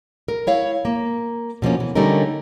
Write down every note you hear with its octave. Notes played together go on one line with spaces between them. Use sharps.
A#4
E4 C#5 F5
A#3
B2 F3 A#3 C#4
E3
D3 G3 A3 C#4 D#4 A#4